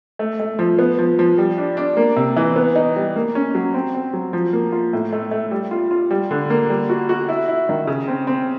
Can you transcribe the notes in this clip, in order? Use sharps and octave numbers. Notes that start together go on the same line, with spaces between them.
A3
A3
F3
B3
F3
F3
G3
D4
D4
A#3
C3
E3
B3
D#4
G3
A#3
C#4
F#3
C4
C4
F#3
F3
A#3
F4
A2
A3
A3
G3
F4
F4
G3
D3
A#3
G3
F#4
F#4
E4
E4
D#3
C#3
C4
C4